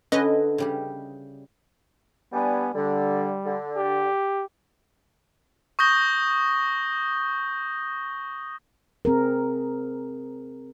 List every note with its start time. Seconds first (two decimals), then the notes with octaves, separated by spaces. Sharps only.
0.12 D3 C#4 E4 B4 D#5
0.58 C#3 G3 G4
2.33 G3 B3 D4 G#5
2.74 D3 G3
3.45 D3
3.77 G4
5.79 C#6 D#6 G6 A#6 G7
9.05 C4 G#4 A#4